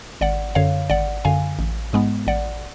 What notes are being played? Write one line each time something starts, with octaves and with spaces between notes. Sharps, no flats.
G#1 D5 F#5
F#2 D3 C#5 F5
G#1 D5 F#5
F#2 D3 F5 G#5
A1
G#2 G#3 B3
A1 D5 F#5